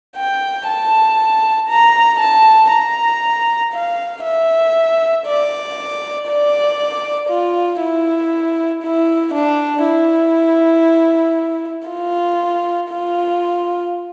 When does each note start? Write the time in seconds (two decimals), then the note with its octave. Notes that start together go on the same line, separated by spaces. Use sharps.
0.16 G5
0.68 A5
1.69 A#5
2.20 A5
2.71 A#5
3.73 F5
4.24 E5
5.26 D5
6.28 D5
7.29 F4
7.80 E4
8.83 E4
9.34 D4
9.85 E4
11.88 F4
12.90 F4